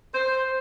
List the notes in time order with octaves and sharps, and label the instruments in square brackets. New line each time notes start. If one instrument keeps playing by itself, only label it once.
[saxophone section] C5